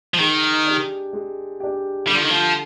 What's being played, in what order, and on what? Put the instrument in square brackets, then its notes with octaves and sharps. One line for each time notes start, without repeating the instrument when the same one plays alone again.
[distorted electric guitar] F3
[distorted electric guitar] D#3 [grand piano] G#3
[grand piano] D4 G4
G#3
D4 G4
[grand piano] D3 [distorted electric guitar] G3
[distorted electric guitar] F3
D#3
F3